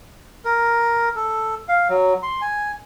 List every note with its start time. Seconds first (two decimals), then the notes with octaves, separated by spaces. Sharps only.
0.45 A#4
1.16 A4
1.68 F5
1.89 F#3
2.23 C6
2.41 G#5